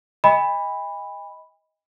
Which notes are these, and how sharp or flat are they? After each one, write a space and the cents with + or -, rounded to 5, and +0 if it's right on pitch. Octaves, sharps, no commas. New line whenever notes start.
D#5 +20 G#5 -45 B5 +0